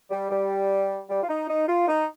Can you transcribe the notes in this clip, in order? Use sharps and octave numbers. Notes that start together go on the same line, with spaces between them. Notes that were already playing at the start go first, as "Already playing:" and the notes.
G3
G3
G3
F4
D#4
D#4
F4
D#4